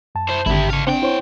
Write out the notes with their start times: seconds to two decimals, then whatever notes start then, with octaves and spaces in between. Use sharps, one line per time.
0.15 F#2 A5
0.29 E4 C5
0.46 G#1 D3 E4 G4
0.70 C#3 A4 F5
0.87 B3 C4 D4 G5
1.02 E4 C5 C#5